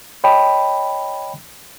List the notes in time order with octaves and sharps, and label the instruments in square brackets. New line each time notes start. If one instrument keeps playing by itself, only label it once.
[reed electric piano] C#5 D#5 G5 A5 B5